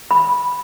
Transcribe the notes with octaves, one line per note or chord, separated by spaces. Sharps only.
B5